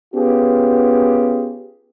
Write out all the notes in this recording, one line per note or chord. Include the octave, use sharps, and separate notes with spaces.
B3 C#4 F4 G4 G#4